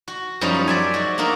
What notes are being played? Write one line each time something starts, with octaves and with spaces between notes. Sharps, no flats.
F#4
F#2 F3 G3 C#4 D#4 C5
D5 E5 G#5
G#3 F#4
A#3 D4 D#4 F#4 A#4